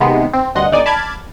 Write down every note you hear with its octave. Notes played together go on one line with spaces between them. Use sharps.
C3 D#3 G#3 B3
C4
D2 G2 D#5 F#5 C6
G1 D#4 D5 G#5
A5 B5 D6 F6 G#6 A6